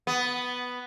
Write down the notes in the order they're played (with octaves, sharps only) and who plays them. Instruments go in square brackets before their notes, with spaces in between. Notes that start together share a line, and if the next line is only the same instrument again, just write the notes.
[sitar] B3